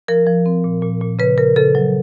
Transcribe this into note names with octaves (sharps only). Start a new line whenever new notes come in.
F3 A#4
F3
C4
A#2
A#2
A#2
C#3 B4
C#3 A#4
C#3 A4
F#3